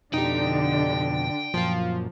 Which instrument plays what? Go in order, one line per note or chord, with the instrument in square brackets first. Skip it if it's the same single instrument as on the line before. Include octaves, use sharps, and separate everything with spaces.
[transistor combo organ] F2 B2 [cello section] D3 [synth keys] D#4 G4 [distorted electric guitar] G5
[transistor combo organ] F#2 A#2 [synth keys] F3 F4